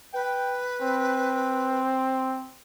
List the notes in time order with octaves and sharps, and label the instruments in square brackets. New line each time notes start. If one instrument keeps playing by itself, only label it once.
[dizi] B4 [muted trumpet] G5
[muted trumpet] C4